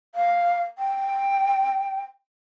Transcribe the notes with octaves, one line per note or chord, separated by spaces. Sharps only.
F5
G5